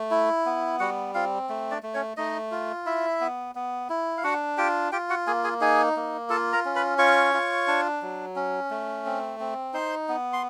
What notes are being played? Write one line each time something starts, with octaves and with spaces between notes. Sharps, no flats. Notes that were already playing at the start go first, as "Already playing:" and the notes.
Already playing: A3
E4
B3
G3 F#4 F#5
C4 F4 F5
A3
D4 D5
A3
C#4 C#5
A3 D#4 D#5
F4
E4 E5
B3
B3
E4
F5
D4 F#4 F#5
F4 G4 G5
F4 G4 G5
F#4 F#5
A#3 G#4 G#5
G#4 G#5
D#4 G#4 G#5
A#3
F4 A4 A5
A#4 A#5
C#4
B4 B5
F4 C#5 C#6
F4
D4
F#3
C#4
A3
C4
C4
D#4 C5 C6
B3
C6